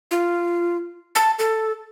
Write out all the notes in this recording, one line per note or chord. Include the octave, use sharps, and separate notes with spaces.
F4
A5
A4